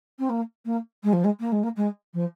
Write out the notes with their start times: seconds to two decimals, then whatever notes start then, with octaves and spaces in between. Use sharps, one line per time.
0.19 C4
0.30 A#3
0.66 A#3
1.04 G#3
1.13 F3
1.24 G#3
1.40 A#3
1.52 G#3
1.63 A#3
1.77 G#3
2.14 F3